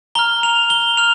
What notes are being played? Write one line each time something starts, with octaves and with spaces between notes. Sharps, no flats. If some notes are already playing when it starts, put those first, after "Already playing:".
A#5 F6 G7
F7
G7
F6 F7